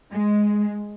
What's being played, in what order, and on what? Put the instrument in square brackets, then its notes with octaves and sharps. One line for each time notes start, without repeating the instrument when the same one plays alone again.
[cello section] G#3